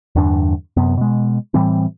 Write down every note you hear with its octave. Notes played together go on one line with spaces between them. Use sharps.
E2 G2 D3 D4
F#2 C3 B3
B2 G#3
A2 E3 G3 C4